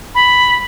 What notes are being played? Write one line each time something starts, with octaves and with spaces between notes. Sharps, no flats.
B5